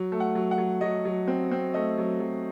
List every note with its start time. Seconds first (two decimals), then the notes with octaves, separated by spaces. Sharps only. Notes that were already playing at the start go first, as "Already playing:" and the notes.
Already playing: F#3
0.12 A3
0.20 F#5
0.35 F#3
0.51 F#5
0.58 F#3
0.81 F#3 D#5
1.05 F#3
1.28 C4
1.51 C4
1.74 A3 D#5
1.98 F#3
2.20 F#3